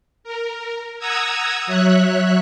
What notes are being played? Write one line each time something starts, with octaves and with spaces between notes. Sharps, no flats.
A#4
F#5 A#5 D#6 E6 G#6
F#3 C#5 E5 F#6